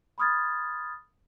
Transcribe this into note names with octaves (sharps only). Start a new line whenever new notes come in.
B5 C6 D#6 F6 G#6 A6